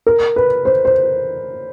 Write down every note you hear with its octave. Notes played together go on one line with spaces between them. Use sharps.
A#4
B4
C5
C5